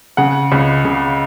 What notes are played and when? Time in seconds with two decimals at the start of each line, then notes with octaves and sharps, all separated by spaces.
0.17 C#3 F#5
0.52 C#2
0.85 C#3